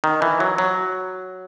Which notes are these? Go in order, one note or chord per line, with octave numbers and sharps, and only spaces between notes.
D#3
E3
F#3
F#3